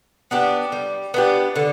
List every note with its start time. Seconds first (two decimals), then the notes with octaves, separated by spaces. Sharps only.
0.31 B3 D4 G4
0.72 G3
1.14 B3 D4 G4
1.56 D3